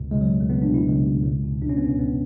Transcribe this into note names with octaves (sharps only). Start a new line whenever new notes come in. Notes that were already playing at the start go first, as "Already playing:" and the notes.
Already playing: C#2 B2
C#2 G#3
F#3
B2
A3
C#2 B3
D4
B2
E4
C#2
B2
C#2
B2
C#2 D4
C#4
B3
B2 C#4
C#2 B3